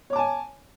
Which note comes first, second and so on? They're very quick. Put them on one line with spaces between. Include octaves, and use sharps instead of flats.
C#5 D6 A5 G#5